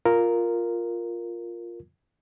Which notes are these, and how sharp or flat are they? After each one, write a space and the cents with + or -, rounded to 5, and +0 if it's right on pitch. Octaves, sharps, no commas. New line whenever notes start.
F4 +0 A#4 +0